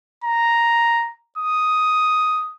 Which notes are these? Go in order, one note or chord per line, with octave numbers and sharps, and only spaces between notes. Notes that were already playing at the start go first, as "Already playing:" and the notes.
A#5
D#6